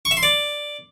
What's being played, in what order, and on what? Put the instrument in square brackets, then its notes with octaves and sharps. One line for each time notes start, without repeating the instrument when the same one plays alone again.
[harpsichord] C#6
E5
C6
D5